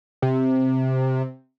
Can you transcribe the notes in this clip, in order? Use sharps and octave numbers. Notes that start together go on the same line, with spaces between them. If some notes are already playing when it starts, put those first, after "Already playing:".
C3